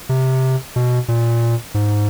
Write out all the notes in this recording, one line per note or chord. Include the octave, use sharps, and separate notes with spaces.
C3
B2
A#2
G#2